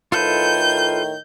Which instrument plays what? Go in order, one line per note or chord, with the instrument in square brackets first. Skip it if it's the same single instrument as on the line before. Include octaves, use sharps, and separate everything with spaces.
[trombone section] A2 D#3 [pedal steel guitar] F4 A4 B4 [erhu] G6